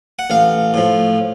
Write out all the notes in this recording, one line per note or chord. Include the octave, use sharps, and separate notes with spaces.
F#5
A1 F5
A2 F3